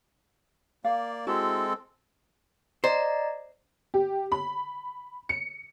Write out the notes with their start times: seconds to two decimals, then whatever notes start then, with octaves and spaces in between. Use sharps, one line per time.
0.85 A#3 D5 F5
1.27 G#3 C4 E4 F#4 A4
2.84 C5 D5 D#5 A#5
3.94 G4
4.32 B5
5.29 C#7